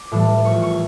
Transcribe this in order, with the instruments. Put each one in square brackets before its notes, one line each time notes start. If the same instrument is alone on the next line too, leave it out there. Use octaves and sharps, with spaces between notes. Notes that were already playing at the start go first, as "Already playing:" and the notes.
Already playing: [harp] D6
A2 E3 G3
A#1 C#6
C#6